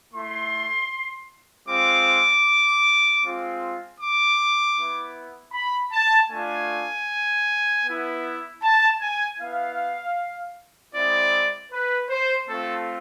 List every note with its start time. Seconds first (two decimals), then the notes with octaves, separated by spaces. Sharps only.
0.13 A3 E4 C6
1.68 G#3 C4 F4 D6
3.22 G#3 C4 F4
4.00 D6
4.77 B3 E4
5.53 B5
5.92 A5
6.30 A3 D4 F4 G#5
7.85 B3 E4
8.62 A5
9.00 G#5
9.39 B3 E4 F5
10.94 G#3 C4 E4 D5
11.71 B4
12.09 C5
12.47 A3 C4 F4 A4